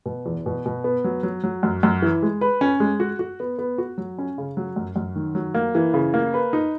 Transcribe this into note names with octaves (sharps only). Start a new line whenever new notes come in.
B2
E2
B2
B2
B3
F#3
F#3
F#3
F#2
F#2
E3
G#3
B4
C#4
G#3
F#4
F#4
B3
B3
F#4
F#3
C#4
C#3
F#3
F#2
F#2
D#3
F#3
A#3
E3
C#3
A#3
B4
D#4